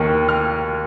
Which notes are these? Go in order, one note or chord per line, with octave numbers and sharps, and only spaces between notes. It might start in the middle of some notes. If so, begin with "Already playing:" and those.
Already playing: D#2 D#3 A#3 F6
F6